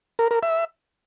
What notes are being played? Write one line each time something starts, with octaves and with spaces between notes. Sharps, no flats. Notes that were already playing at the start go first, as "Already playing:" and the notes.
A#4
A#4
E5